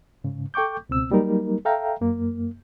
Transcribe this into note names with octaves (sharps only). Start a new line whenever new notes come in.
G#2 C#3
A4 G5 C#6 D6 G6
C#2 B2 C4 E6
F#3 G3 A#3 D#4 A#4
A4 E5 F5 G5 A#5
F#2 A#3